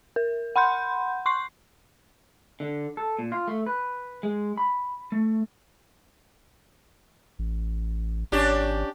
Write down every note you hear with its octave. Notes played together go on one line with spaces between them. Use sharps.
A#4
F#5 B5 C6 G6
C6 C#6 C7
D3
A4
A#2
F4
A3
B4
G#3
B5
A3
A1
G#1 C#4 D4 G4